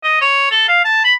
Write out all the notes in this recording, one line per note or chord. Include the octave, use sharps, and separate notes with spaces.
D#5
C#5
A4
F5
A5
B5